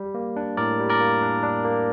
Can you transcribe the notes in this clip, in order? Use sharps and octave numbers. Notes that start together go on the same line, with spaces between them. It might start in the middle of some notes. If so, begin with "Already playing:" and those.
Already playing: G3
A#3
D4
A2 A#4 D5
G3
A#4 D5
A#3
D4
D4
A#3